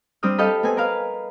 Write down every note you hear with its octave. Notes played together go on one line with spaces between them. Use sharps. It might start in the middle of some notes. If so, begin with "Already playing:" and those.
G3 C4 D4 D#6 F6
G4 A4 D#5 F5 A5 B5
B3 C4 G#5
A#4 B4 F5